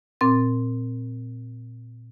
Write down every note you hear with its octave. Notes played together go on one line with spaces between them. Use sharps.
A#2 C4 A6